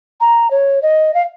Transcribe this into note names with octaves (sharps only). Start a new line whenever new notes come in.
A#5
C#5
D#5
F5